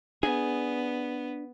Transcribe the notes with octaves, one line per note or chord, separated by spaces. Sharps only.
B3 D4 G#4